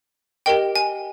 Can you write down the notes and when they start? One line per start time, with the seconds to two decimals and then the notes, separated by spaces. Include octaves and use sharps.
0.46 G4 A#4 D#5 G5
0.76 G#5